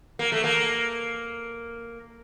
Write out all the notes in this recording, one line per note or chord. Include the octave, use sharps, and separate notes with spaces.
A#3
A3
A#3